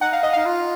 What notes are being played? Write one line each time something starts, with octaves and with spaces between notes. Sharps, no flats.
D#4 F#5
F5
D#5
D#4 F5
F4